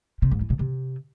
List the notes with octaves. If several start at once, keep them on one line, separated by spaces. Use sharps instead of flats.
C3
G#2
E3
B2
C3